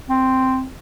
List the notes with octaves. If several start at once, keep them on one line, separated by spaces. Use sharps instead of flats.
C4